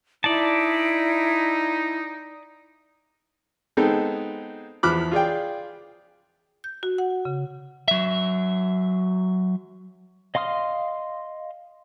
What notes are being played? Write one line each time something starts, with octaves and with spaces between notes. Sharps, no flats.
D#4 E4 D5 A5
G#3 B3 C4 D#4 G#4 A4
E2 F3 B5 D6 F6 F#6
F4 G#4 D5 G5
G6
F#4
F#5
C#3
F#3 E5
D#5 F5 C6 D#6 F6